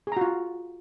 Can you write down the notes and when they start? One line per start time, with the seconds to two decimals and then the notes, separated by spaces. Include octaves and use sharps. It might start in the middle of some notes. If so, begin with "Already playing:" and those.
0.07 G#4
0.12 A#5
0.17 F#4
0.21 F4